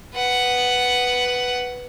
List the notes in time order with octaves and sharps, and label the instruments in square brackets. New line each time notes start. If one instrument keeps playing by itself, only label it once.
[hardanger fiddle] B4 F#5